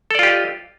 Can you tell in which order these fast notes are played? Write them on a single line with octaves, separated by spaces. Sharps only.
A4 D5 F4 G4 D#5